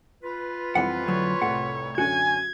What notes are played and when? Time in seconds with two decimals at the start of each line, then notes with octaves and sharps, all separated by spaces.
0.23 F4 B4
0.75 F2 E3 G3 C4 F#5
1.08 D2 F#3 C#5
1.42 C2 A2 F#5
1.98 F#2 D3 C#4 F#4 G#5 G#6